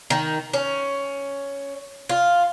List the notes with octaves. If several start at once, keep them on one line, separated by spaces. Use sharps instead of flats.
D#3
C#4
F4